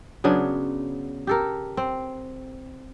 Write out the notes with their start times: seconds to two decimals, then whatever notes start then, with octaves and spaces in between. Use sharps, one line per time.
0.24 C#3 F#3 B3 D4
1.27 G4 A4 A#4
1.77 C4